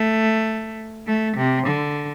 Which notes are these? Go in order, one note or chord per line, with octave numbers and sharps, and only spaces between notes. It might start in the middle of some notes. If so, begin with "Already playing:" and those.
Already playing: A3
A3
C3
D3